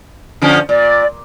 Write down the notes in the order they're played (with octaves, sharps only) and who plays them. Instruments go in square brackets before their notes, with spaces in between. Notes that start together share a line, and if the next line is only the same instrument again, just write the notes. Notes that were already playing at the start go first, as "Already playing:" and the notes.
[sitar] D3 F3 C#4
[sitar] A#2 [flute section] D5